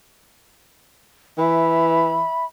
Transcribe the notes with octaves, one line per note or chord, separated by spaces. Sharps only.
E3 E5 B5